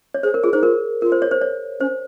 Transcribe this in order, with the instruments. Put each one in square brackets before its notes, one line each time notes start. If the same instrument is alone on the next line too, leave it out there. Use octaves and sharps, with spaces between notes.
[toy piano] C#5
[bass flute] G#4 [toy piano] C5
[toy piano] A#4
[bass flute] F4 [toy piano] G#4
[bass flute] D#4 [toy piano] C5
[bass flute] F4 [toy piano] A#4
[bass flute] F4 [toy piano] A#4
[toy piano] C5
C#5
C5
C#5
[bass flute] C#4 [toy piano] C5